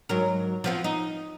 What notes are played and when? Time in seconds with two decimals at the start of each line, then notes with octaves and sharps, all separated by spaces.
0.09 G#2 F#3 A#4
0.64 F3 B3 C4
0.84 D#4